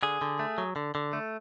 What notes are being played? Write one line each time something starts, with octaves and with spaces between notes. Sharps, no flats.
D3 G#4
D3
A3
F#3
D3
D3
A3